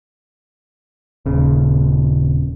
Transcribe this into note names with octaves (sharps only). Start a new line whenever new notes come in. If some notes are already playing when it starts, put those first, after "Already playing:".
D#1 C#3